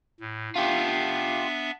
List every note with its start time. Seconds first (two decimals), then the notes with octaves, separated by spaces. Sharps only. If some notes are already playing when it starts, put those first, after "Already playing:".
0.20 A2
0.56 B3 D4 F4 G4 E5